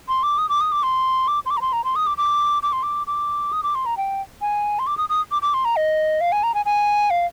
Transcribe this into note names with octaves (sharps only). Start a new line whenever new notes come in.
C6
D6
D#6
D6
D#6
D6
C6
D6
C6
D6
A#5
C6
A#5
C6
D#6
D6
D6
D6
C6
D6
D6
D#6
D6
C6
A#5
G5
G#5
C6
D6
D#6
D#6
D6
D6
C6
A#5
D#5
F5
G#5
A#5
G#5
G#5
F5